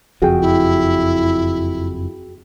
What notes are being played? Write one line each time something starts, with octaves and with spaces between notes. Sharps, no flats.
F#1 F2 F#4 G#4 G5
E4